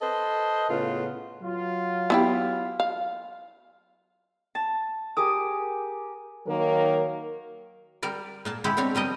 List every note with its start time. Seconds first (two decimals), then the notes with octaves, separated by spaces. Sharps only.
0.01 A4 B4 C5 D#5
0.70 A2 C#3 B3 F4
1.42 F#3 F4
2.10 B3 E4 G4
2.80 F5
4.55 A5
5.17 G4 G#4 A#4 D6 D#6
6.47 D#3 F#3 A#3 A#4
8.03 G3 A#4 D5
8.45 A#2 A#3 A5
8.64 G#3 E4 F#4 G4
8.77 B2 C4 D4 C#5
8.95 F3 G3 A#4 D#5